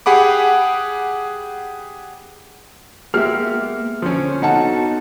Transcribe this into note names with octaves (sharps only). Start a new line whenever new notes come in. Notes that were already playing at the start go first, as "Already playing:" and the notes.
G4 G#4 F#5 B5 D6
G#3 A#3 B3 G4 E5 F6
D3 F3 C#4
B3 D#4 F#4 A4 F#5 A5